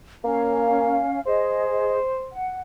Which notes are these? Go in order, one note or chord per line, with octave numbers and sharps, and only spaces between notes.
A#3 C#4 F5
G#4 C5 D#5
F#5